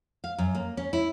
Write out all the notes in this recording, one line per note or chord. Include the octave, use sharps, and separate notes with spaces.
F5
F#2
A#3
C#4
E4